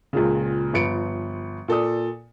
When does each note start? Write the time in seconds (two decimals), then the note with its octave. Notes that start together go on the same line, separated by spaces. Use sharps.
0.13 C#2 A#2 C#3
0.73 G1 F3 B4 C#7 D7
1.68 A#2 A4 D5 D#6